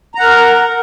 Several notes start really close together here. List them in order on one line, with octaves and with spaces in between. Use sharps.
A#5 F#5 A#4